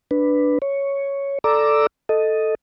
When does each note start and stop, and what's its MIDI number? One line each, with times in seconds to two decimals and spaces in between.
0.11 0.59 62
0.11 0.59 71
0.62 1.38 73
1.44 1.87 69
1.44 1.87 74
1.44 1.87 82
1.44 1.87 86
1.44 1.87 88
2.09 2.55 69
2.09 2.55 75